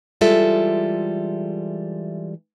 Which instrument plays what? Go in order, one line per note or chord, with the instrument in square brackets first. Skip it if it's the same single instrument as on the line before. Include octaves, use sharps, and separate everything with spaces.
[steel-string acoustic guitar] E3 G3 G#3 F4 A4 E5